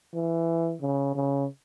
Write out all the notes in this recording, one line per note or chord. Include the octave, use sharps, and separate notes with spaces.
E3
C#3
C#3